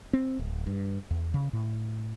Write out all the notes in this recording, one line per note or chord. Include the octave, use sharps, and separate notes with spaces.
C4
D1
G2
E2
C#3
A2